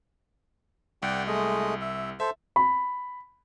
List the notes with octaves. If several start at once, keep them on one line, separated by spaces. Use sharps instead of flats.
C2 D5 F#5 G5
G#3 A3 D#5
E5
A4 C5 E5
B5